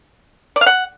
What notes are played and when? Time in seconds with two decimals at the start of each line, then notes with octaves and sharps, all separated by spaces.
0.56 D5
0.61 F5
0.66 F#5